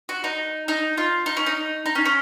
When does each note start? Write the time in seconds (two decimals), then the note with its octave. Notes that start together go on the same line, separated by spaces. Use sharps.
0.09 F#4
0.24 D#4
0.68 D#4
0.98 F4
1.26 D#4
1.37 C#4
1.46 D#4
1.86 D#4
1.95 C#4
2.05 C#4